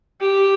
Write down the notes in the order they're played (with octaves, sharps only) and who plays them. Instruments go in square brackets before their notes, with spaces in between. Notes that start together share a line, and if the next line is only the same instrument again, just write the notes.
[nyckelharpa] G4